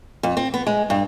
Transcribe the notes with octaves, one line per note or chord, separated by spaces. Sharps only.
F2
C4
B3
G#3
G2